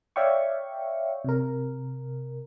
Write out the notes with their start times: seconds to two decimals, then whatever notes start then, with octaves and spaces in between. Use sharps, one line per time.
0.16 C#5 D5 E5 F5 G5 C#6
1.24 C3 A#4